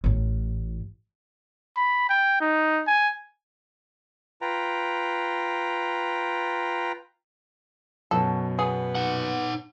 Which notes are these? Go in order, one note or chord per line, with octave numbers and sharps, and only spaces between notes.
A1 A2
B5
G5
D#4
G#5
F4 B4 G5 A#5
F#2 B2 A4
B3 G#4
D#4 F#5